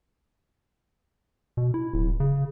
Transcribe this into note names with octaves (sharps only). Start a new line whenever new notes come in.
B2
E4
D1
C#3